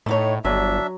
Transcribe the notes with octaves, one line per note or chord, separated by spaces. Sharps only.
A2 A3 D#4 C#5
G1 F#3 D4 E5